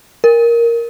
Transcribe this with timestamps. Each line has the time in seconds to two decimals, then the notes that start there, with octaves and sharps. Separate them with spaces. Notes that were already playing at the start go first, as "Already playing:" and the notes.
0.24 A#4